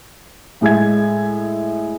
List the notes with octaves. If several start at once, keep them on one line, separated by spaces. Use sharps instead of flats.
A2 G#3 E5 G#6